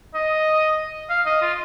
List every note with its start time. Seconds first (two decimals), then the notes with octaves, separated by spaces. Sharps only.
0.14 D#5
1.10 F5
1.26 D#5
1.41 F4